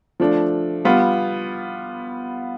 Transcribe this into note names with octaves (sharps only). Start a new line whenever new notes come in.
F3 A3 D4
G3 B3 F4